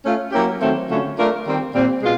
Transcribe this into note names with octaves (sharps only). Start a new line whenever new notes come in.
A3 C#4 F4
F#3 A#3 C#4 E4 G4
D#3 F#3 A3 C4
D3 F#3 A3 C#4 F4
A3 D4 F4 A#4
D#3 G3 C4
A#2 G3 C4
B2 G#3 F4